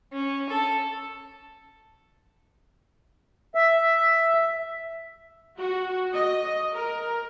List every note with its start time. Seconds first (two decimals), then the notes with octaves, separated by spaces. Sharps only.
0.12 C#4
0.49 A4
3.55 E5
5.58 F#4
6.14 D#5
6.75 A#4